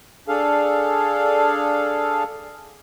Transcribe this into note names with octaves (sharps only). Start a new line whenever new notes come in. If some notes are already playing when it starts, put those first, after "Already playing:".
D4 G#4 A4 F5